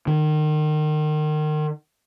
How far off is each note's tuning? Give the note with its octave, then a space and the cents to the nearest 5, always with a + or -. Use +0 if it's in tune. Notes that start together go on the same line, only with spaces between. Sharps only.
D#3 -30